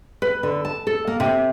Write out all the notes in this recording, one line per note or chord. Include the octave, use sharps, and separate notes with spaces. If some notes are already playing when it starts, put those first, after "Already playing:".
B4
D3
A5
A4
A#3
C3